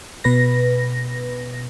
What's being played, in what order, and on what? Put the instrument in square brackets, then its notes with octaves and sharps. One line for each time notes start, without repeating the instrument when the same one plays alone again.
[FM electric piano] B2 B4 A#6